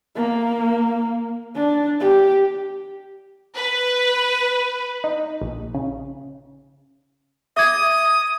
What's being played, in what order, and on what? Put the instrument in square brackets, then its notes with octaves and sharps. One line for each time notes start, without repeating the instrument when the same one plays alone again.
[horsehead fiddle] A#3
D4
G4
[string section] B4
[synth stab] D#4
A#1
C#3
[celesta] E5 D6 G#6 [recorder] D#6